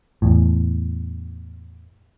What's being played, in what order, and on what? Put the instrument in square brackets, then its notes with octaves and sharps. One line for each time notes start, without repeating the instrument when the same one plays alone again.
[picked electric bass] E2 A2